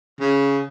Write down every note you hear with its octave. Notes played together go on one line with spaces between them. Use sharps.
C#3